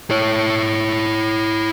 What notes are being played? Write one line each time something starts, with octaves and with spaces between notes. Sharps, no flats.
E4 C#5